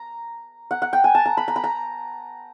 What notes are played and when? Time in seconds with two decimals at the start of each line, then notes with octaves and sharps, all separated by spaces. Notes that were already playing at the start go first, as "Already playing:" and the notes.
Already playing: A#5
0.71 F#5
0.82 F#5
0.93 G5
1.04 G#5
1.15 A5
1.26 A#5
1.37 B5
1.48 A#5
1.56 B5
1.64 A#5